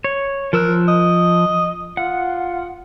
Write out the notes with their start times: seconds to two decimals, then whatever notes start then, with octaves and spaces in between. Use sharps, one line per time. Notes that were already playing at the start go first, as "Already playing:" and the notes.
0.04 C#5
0.53 F3 A#4 E6 F#6
0.88 D#5
1.97 F4 F#5